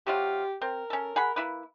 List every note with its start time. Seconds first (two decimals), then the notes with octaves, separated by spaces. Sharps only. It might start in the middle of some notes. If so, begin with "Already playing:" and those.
0.07 C3 F#3 F4 G4
0.62 C4 A#4
0.90 C#4 A4
1.16 G#4 F#5 B5
1.36 A#3 E4 B4